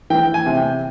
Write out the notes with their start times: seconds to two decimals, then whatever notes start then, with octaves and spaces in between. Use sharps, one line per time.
0.10 E3 G5
0.34 G#5
0.46 C3
0.57 G5